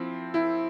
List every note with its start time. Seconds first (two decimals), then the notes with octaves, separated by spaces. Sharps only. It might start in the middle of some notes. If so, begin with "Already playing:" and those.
Already playing: F3 C4 E4
0.34 E4